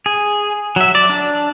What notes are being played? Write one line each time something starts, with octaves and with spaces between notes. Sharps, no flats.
G#4
F#3 E5
D5
D4